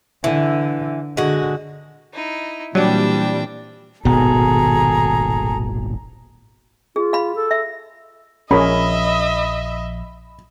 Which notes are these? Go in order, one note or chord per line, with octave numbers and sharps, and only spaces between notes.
D3 E3
D3 G#3 F#4
D#4 E4
A#2 E3 F#3 G3 C4 D4 G5
D#1 G#1 B2 D#3 G#4 A4 A#5
F4 G#4
F5 B5
A4
E5
A#1 F3 C#4 G#4 A#4 D#5 E5 B5